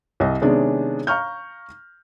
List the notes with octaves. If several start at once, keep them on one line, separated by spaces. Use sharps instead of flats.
C2 D#5
C3 D#3 G#3 B3 C#4 D4
F5 A#5 C#6 F6 G6